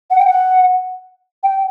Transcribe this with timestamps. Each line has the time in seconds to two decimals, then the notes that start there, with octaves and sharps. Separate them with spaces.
0.11 F#5
0.19 G5
0.27 F#5
1.44 G5